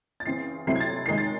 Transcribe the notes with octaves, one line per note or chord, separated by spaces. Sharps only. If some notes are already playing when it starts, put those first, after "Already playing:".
A6
C#3 E3 C4 C7
C3 F#3 A3 C4 E4 C7
G#6
A6
D#3 G#3 D#4 C7
A6